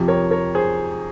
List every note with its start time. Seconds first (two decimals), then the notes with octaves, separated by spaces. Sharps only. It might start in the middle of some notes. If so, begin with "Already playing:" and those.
Already playing: F2 C3 F3
0.08 A#4 C#5
0.31 A#4 C#5
0.55 G#4 C5